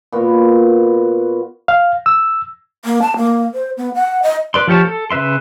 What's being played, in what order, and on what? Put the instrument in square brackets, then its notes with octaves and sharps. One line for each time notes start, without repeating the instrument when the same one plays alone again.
[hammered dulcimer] A#2 B3 F#4
[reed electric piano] F5
E6
[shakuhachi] A#3
A5
A#3
C5
B3
F#5
D#5
[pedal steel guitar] B4 D5 C6
F3 F4 G4 C#5 A5
A4
C#3 B4 E5 C6